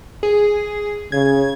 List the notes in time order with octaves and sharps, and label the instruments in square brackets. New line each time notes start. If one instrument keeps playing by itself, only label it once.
[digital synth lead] G#4
[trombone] C#3 [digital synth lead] G#6